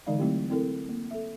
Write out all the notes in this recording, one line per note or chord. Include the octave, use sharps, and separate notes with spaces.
D3 E3 G#3 D#4 D5 F5
F#3 A3 C4 E4 G4
C4 E4 A4 A#4
A#3
A4 E5